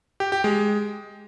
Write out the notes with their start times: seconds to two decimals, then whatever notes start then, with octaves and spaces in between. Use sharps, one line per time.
0.20 G4
0.32 G4
0.44 G#3